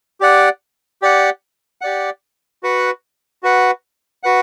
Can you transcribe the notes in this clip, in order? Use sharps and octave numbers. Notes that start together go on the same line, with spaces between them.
G4 D5 F#5
G4 D5 F#5
G4 D5 F#5
F#4 B4 F#5
F#4 B4 F#5
F#4 B4 F#5